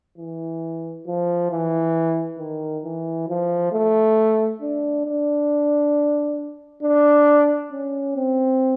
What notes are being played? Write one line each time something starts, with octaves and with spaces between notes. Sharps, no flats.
E3
F3
E3
D#3
E3
F3
A3
D4
D4
D4
C#4
C4